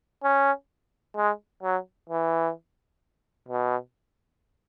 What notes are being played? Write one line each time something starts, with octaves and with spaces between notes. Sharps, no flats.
C#4
G#3
F#3
E3
B2